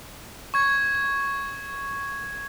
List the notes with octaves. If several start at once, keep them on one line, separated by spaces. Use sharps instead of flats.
C#6 G#6